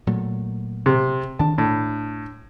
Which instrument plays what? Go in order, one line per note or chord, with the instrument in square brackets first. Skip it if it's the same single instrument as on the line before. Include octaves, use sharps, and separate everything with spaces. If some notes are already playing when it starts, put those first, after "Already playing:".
[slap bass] A#2 F#3 A3
[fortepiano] C3
[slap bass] D#3 D4 [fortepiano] A5
[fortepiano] A2 [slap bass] D4